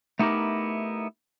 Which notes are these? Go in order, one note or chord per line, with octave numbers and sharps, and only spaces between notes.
A3 B3 D#4 E4 G4 A#4